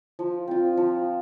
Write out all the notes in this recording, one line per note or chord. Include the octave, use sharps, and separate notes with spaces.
F3
C4 F4
F3